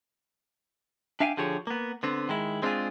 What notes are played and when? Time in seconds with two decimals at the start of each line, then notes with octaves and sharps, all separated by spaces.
1.20 D4 E5 F5 G5 G#5
1.37 D3 F3 G4 G#4 C#5
1.67 A#3 B3
2.03 D3 B3 C4
2.29 D#3 G#3 E4
2.62 G#3 C4 D4 D#4 F4 G#4